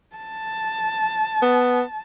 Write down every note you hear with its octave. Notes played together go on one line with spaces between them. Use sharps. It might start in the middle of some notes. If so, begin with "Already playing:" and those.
A5
B3